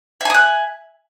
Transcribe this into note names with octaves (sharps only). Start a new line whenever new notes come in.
E5 G#5 D#6 F#6